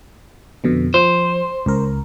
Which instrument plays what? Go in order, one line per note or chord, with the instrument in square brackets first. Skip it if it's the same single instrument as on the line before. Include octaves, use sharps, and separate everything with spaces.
[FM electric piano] F2 B2 D3
[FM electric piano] F3 [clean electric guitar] C5
[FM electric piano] C#2 A#4